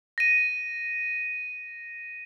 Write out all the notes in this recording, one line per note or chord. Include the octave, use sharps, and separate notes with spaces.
A#6 D#7